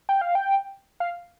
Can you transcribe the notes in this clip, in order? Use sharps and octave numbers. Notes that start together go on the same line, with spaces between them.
G5
F5
G5
F5